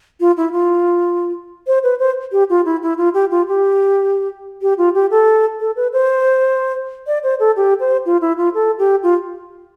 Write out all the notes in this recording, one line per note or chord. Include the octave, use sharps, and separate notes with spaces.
F4
E4
F4
C5
B4
C5
G4
F4
E4
E4
F4
G4
F4
G4
G4
F4
G4
A4
A4
B4
C5
D5
C5
A4
G4
C5
F4
E4
F4
A4
G4
F4